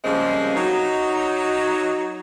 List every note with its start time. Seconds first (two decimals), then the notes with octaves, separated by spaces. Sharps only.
0.05 C#3 F3 G3 G#3 A#3 C4
0.56 F#3 D#4